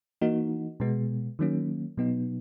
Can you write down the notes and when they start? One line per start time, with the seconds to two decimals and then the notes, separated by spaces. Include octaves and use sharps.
0.21 E3 A#3 D#4 F#4
0.80 B2 G#3 B3
1.39 D#3 F#3 A#3 C#4
1.97 B2 F#3 B3 D#4